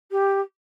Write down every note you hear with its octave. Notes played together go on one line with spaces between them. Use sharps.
G4